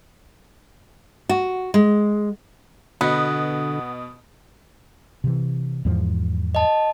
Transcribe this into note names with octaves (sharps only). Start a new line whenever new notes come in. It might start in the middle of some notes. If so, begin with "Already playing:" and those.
F#4
G#3
B2 D3 B3 D#5
C3 E3
E2 G#2 F3
D#5 A5